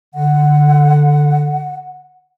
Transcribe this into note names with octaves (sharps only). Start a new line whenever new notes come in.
D3 F#5